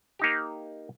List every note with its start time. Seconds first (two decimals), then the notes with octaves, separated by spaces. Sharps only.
0.19 A#3 D#4 G4